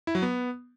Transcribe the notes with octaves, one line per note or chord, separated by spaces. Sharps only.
E4
F#3
B3